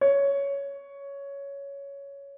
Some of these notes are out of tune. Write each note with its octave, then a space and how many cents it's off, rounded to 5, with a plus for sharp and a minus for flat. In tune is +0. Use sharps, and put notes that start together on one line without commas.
C#5 +10